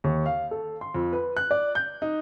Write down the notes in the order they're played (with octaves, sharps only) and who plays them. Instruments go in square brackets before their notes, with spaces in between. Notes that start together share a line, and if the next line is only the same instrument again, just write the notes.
[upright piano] D#2
F5
A4
C6
F2
B4
F#6
D5
G6
D#4